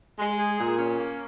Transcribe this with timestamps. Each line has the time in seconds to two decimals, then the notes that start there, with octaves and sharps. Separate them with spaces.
0.19 G#3
0.39 G#4
0.58 A#2
0.78 C#4
0.98 A#3